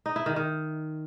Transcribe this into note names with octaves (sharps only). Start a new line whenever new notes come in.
D#4
E4
D#3
D#3